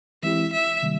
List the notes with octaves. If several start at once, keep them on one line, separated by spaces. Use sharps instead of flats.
E3 G#3 C4 E4 G4 E5
E5
C3 D#3 G3 A#3